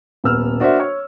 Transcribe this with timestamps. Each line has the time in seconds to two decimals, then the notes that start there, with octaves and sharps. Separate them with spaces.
0.24 D#1 B3 E6 F6
0.60 D4 F#4 A#4 C5 E5
0.80 C#5